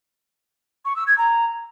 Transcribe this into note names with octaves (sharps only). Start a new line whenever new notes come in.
C#6
E6
G#6
A#5